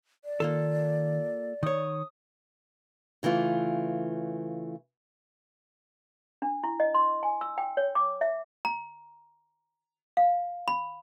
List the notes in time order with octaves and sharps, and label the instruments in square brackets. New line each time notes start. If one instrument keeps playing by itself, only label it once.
[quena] D5
[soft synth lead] D#3 [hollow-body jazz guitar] A#3 F4 A4
[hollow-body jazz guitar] D#3 C#5 [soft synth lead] D#6
[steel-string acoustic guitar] C#3 E3 A3 F4
[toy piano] D4
E4
D#5
C6
G#5
E6
G5
C#5
D6
E5
A#5
F5
B5